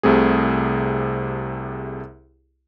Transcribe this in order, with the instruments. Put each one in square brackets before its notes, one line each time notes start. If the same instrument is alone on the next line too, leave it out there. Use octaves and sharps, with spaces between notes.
[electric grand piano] C2 C3 A3 G#4